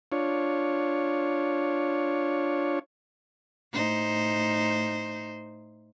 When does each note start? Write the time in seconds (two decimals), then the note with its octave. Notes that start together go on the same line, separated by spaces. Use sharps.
0.12 D4 F4 C#5
3.73 A2 D#4 C5